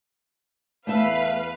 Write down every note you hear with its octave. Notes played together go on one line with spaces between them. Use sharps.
E2 A3 B4 E5 F5